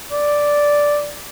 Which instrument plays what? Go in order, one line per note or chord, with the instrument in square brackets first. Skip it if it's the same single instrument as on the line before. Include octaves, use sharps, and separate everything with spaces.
[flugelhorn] D5